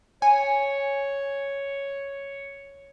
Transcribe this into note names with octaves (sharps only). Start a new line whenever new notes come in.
C#5 G#5